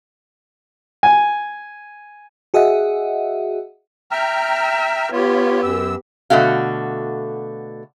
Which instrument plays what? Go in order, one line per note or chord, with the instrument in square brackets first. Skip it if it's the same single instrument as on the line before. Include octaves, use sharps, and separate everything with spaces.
[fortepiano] G#5
[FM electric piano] F#4 G#4 D#5 E5 F#5
[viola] E5 [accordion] G5 A#5 F6
[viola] B3 G4 [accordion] F4 C#5
[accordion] F#2 E6
[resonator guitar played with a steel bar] B2 D3 A3 F#4 F5